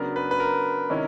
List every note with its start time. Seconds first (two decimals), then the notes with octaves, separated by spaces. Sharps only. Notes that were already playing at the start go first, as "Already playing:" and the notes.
Already playing: C#3 F#3 B3 D4 A#4
0.16 B4
0.31 B4
0.40 A#4
0.90 C3 D#3 G#3 C#4 E4